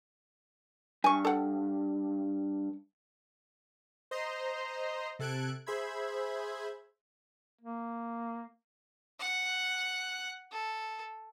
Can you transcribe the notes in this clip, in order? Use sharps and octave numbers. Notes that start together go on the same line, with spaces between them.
G2 G#5 C#6
A4 F#5
C5 D#5 A#5 C6
C3 A4 F#6 G#6 D7
G#4 C5 E5 B5 G#6
A#3
F#5 F#6
A4